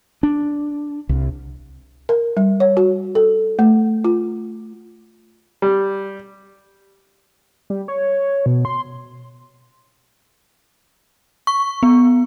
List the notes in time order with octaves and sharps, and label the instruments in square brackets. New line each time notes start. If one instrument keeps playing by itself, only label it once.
[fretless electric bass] D4
C2
[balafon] A#4
G3
C#5
F#4
A4
A3
F4
[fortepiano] G3
[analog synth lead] G3
C#5
B2
C6
[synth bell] C#6
B3